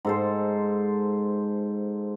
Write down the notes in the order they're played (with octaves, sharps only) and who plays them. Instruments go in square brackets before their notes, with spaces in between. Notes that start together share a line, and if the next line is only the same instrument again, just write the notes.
[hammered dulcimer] G#2 A4 C5